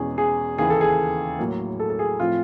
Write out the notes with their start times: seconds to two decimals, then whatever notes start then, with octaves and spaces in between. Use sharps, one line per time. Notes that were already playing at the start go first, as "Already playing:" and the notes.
Already playing: E2 B2 G#3 C#4 G#4
0.18 G#4
0.58 D#2 C#3 E3 G#4
0.70 A4
0.81 G#4
1.39 A2 F#3 A#3
1.80 A4
1.90 A4
1.99 G#4
2.20 A2 F3 A3 C4 F4